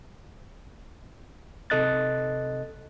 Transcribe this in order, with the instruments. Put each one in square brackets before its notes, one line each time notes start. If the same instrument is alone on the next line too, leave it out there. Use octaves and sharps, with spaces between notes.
[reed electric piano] C3 A4 D#5 F#6 A6